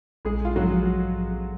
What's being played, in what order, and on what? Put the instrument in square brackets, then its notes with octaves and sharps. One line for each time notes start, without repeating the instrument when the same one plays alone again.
[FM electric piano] A#1 [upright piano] G#3 G#4
[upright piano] F4
[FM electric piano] G#2 F3 [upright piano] F#3 F#4